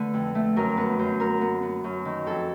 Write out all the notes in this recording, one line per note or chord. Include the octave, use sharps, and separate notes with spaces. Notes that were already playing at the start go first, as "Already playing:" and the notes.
Already playing: D3 A3 B4
F2
A3
F#2 A#4
B3 B4
F#2 C5
B3 A#4
B3
B3
F#2
D#3
F2 A4